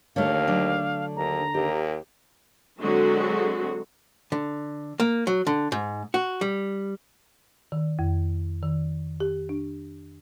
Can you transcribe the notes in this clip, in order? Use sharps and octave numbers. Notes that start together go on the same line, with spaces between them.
D#2 D3 A3 D4 C#5 F5
F#3 D4
D#2 A#5
D#2 G4
D3 F#3 G#3 C4 F#4 G#4
D3
A#3
F#3
D3
G#2
F#4
G3
D#3
F2
D#3
G4
D4